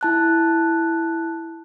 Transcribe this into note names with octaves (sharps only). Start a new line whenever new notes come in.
E4 A5 F#6